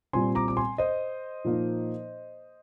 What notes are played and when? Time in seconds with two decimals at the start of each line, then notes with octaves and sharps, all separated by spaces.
0.13 A#2 G3 C4 G#5 C6
0.35 A#5 D6
0.48 D6
0.57 G#5 C6
0.78 C5 D#5
1.44 A#2 F3 A#3 D#4